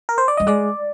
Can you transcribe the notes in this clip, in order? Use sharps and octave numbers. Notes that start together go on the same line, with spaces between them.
A#4
C5
D5
G3 D#5
G#3 D5